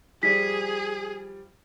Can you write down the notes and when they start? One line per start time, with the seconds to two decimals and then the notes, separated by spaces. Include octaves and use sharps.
0.23 F3 G3 G#4 D5 B6